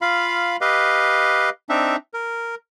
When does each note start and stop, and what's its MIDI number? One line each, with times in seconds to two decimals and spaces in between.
0.01 0.57 65
0.01 0.57 77
0.01 0.57 83
0.61 1.50 67
0.61 1.50 71
0.61 1.50 75
0.61 1.50 77
1.69 1.96 60
1.69 1.96 62
1.69 1.96 63
1.69 1.96 76
2.14 2.55 70